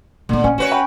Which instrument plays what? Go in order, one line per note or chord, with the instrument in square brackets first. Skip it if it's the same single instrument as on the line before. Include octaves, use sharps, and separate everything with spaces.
[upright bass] A#2 B3 [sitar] D3
[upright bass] A#1 [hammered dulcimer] C#4
[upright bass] C4 [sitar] F#4 B4 C#5
[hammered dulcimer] G5 B5 C#6